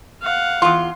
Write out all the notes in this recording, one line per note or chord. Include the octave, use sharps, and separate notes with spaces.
F5 F#5
E2 F4 C6